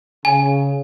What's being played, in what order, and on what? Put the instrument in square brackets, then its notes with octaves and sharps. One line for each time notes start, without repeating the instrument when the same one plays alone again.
[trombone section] C#3 [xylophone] G#5